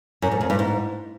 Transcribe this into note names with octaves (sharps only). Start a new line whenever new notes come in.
F#2
G#2
F2
G2
G#2